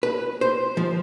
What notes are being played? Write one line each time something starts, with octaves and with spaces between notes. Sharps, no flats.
B4
C5
F3